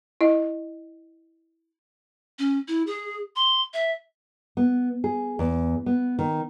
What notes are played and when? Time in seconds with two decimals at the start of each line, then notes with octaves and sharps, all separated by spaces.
0.21 E4 D#5
2.39 C#4
2.68 E4
2.87 G#4
3.36 C6
3.74 E5
4.57 B3
5.04 G#4
5.39 E2
5.86 B3
6.19 D#3